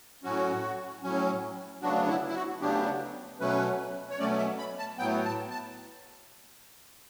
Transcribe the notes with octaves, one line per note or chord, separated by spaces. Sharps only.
A2 F#3 C#4 F#4
A2 F#3 C#4
D2 C#3 F#3 B3 D4 F#4
E4
E4
F#4
D2 C#3 F#3 B3 D4 G4
B2 F#3 A3 C#4 B4
C#5
B2 F#3 A3 C#4 D5
E5
B5
A5
A2 F#3 B3 G5
A5
A5